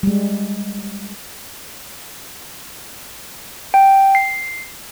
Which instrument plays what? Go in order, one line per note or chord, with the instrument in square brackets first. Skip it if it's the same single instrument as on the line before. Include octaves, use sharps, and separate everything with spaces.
[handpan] G3 G#3
[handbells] G5
C7